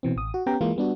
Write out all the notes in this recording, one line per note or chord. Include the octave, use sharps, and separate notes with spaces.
B2 E3 C4
A1 D#6
F#4
B3 C#4 G4 G5 A#5
E3 G#3 A#3 F4
G3 B3 D4 F#4